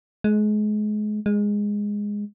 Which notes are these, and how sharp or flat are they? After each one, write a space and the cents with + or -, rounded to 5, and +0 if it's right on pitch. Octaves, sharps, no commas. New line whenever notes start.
G#3 +30
G#3 -10